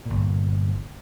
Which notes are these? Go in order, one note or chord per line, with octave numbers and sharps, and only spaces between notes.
G1 A#2